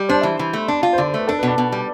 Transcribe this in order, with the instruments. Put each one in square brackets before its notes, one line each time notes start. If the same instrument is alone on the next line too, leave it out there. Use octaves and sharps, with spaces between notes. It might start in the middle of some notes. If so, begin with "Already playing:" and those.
Already playing: [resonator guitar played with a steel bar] G3
[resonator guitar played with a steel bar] D4 [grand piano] C5
[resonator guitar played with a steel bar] E3
E3
A3
D4
F4
[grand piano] C5
[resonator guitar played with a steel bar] D3 [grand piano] D5
[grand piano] C5
[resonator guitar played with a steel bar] A3 [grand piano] B4
[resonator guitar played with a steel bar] D4 [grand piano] A4
[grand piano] B4
[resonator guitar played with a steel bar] B2
[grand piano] D5
[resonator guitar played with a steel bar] B2
G3